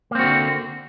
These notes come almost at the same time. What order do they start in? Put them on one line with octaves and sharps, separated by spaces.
A#3 C4 F#4 D3